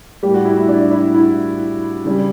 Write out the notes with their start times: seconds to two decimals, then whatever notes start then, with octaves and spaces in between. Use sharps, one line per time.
0.23 A2 G3 G4
0.34 F#4
0.45 E4
0.57 E4
0.69 D4
0.91 E4
1.15 E4
2.05 C#3 G3